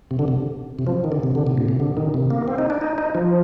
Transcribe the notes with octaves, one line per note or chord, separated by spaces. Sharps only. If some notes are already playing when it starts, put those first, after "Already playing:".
C3
D3
C3
C3
F3
D#3
D3
C3
D3
C3
A#2
C3
D3
D#3
C3
A#3
C4
D#4
D4
D#4
D#4
F3